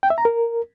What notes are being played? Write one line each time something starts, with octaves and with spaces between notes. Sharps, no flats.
G5
E5
A#5
A#4